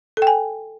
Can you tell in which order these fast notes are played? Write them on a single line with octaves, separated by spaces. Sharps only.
A4 G5 G#5